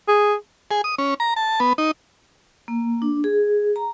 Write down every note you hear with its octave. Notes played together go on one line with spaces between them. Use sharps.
G#4
G#4
D#6
C#4
A#5
A5
B3
D#4
A#3
D4
G#4
A#5